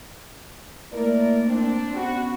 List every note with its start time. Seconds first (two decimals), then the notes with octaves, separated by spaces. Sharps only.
0.92 A3 A#3 E4 A#4 D5
1.46 C4 D4
1.94 B3 C#4 F#4 B5